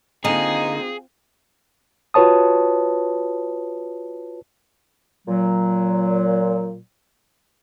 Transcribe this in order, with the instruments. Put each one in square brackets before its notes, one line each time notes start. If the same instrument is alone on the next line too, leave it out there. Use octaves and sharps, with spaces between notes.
[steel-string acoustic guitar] D3 A#3 [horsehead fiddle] C4 F4 [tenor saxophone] D#4 [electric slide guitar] G#4
[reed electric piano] F4 F#4 B4 C#5 A5 D#6
[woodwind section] A#2 F#3